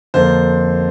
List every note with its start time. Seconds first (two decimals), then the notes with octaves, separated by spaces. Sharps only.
0.14 F2 D3 A#3 C5